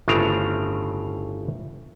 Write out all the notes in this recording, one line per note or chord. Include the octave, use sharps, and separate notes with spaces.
G1 A2 C#3 C4 D4 A#5